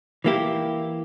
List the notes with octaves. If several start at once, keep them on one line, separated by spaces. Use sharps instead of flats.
E3 A#3 E4 G4